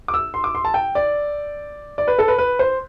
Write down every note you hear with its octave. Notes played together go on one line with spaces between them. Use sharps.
D6
E6
C6
D6
C6
A5
G5
D5
D5
B4
A4
B4
B4
C5